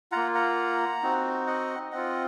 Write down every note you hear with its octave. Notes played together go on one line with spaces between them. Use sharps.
A#3 F4 F#5 A#5
F#5 A#5
C4 D#4 F#4
D#5 F#5
C4 F4 D#5 F#5